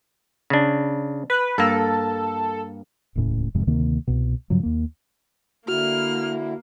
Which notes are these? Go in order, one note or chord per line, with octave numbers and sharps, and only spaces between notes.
C#3 D4
B4
G2 A#3 A4
D#1 C#2 A2 C#4
E1 F2 G#2 C3
D2 C3 D#3 A#3
C2 B2
G2 C#3 F3 F#3
D#2 A#3
D3 A#3 E4 F#4 F6